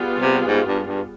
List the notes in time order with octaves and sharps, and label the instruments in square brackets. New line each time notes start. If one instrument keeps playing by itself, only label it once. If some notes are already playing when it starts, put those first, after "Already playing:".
Already playing: [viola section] G3 B3 F4 G#4
[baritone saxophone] C3
G#2
G2
G2